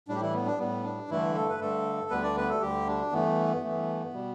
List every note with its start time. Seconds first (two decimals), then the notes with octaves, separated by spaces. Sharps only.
0.08 A2 G3 D4
0.15 G4
0.21 E3 E4
0.34 B3
0.46 D4
0.59 A2 G3 B3
0.84 D4
1.09 G2 D3 E3 A3 E4
1.35 A3 A4
1.49 B4
1.60 G2 D3 A3 A4
2.10 D2 D3 G3 B3 B4
2.23 D4 D5
2.37 B3 B4
2.49 A3 A4
2.61 D2 D3 G3 G4
2.87 D4
3.12 G2 E3 A3 B3
3.63 G2 E3 A3
4.13 B2 G3